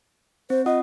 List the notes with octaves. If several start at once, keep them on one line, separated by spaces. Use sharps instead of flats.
C4 C5
F4 D#5 F#5 D#6